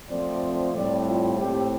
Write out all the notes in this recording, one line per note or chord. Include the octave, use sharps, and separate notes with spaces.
F2 F3 A3 C4 D5
A2 G3 C4 D5
F4
A2 A3 C4 G4